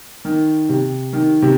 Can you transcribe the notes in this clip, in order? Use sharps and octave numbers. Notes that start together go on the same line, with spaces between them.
D#3
C3
D#3
C3